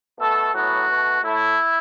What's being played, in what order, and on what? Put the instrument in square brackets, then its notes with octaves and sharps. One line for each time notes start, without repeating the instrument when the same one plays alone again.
[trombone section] B2 A3 A4
A2 F#3 B3 F#4
B2 A3
A2 A3 E4